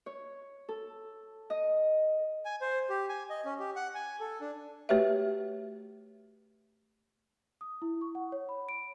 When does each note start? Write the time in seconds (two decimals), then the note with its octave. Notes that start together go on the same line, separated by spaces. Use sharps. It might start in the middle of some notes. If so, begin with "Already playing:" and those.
0.06 C#5
0.69 A4
1.50 D#5
2.45 G#5
2.61 C5
2.90 G4
3.09 G#5
3.30 D#5
3.45 C#4
3.59 G4
3.76 F#5
3.95 G#5
4.20 A4
4.41 D4
4.89 A3 F#4 G4 B4 C#5 E5
7.61 D#6
7.82 E4
8.01 C#6
8.15 F#5
8.32 C#5
8.49 B5
8.69 D7